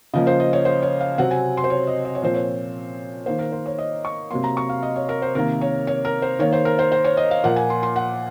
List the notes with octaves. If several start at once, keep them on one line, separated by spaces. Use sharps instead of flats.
C#3 F3 A#3 D#5
C5
D#5
C#5
C5
C#5
F5
C3 F#3 C4 F#5
G#5
C6
C5
C#5
D#5
D#5
C#5
A#2 F3 C4 C5
C#5
D#3 A#3 C5
A#4
C5
C#5
D#5
C#6
C3 F#3 A#3 C6
A#5
C#6
F5
D#5
C#5
A#4
C5
C3 D#3 A#3 A#4
C#5
C#5
A#4
C5
D#3 A#3 C#5
C5
A#4
C5
C5
C#5
D#5
F5
A#2 F3 A#3 F#5
G#5
C6
C6
F#5